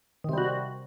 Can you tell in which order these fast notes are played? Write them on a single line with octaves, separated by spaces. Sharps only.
D#3 C3 G3 F#4